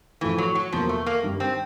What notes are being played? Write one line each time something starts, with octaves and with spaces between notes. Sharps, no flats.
A2 E3 F3 A3
F#3
F#3
E2 B2 F3 F#3 A#3
A3
A#3
G2 D#3 G3
C4